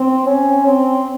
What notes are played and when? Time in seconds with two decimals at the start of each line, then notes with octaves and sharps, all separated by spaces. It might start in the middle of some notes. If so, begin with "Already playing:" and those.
Already playing: C4
0.26 C#4
0.65 C4